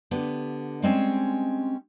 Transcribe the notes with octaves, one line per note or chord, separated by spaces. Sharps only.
D3 B3 G4
G3 G#3 C4 C#4